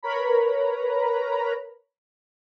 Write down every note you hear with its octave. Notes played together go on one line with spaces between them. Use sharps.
A#4 B4 C#5 A#5 B5